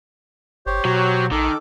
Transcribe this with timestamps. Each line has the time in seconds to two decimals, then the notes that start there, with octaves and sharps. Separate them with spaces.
0.66 G1 G4 C5 C#5
0.85 B2 F#3
1.32 A#1 D#3 A4 D6